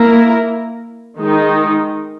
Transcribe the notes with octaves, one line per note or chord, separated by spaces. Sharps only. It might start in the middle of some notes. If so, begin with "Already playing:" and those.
Already playing: A#3 E4 A#4
D#3 G#3 D#4